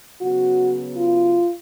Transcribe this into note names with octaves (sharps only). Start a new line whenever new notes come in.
C#3 F#3 B3 F#4
F4